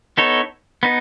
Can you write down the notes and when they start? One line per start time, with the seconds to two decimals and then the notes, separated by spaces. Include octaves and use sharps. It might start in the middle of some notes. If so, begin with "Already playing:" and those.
0.17 B3 D#4 A4 C#5
0.83 B3 D#4